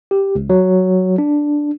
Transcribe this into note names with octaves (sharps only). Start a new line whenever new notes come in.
G4
C#2
F#3
D4